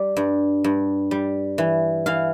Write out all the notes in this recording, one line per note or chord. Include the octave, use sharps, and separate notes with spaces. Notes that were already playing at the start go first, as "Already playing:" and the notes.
Already playing: G3 D5
G2
G2
G3
E3
E3 F5